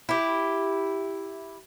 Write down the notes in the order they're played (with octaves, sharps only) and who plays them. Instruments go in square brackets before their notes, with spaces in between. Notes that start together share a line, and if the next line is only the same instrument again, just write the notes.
[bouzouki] E4 G4